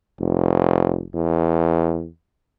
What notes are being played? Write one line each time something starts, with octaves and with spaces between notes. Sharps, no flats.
F1
E2